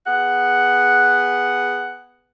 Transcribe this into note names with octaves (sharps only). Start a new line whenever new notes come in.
B3 G#4 F#5